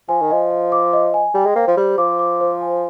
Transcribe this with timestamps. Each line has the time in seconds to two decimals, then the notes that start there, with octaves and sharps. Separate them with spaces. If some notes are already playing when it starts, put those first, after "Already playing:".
0.09 F3 G#5
0.22 D#3
0.30 F3 D#5
0.50 D#5
0.72 D6
0.93 D#5
1.14 G#5
1.34 G3 G5
1.46 G#3
1.56 A#3 C5
1.68 F3
1.76 G3 C5
1.98 F3 D6
2.19 D6
2.41 C5
2.61 G#5